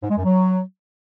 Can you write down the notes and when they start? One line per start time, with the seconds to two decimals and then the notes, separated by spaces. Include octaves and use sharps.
0.03 G#2
0.10 G#3
0.17 F#2
0.24 F#3